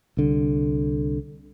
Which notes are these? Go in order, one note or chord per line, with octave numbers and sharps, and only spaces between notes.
C2 D3